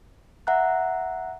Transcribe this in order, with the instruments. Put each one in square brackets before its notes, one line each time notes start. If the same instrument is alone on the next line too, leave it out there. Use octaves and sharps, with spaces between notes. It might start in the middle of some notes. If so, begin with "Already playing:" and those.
[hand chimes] E5 F#5 A#5 F#6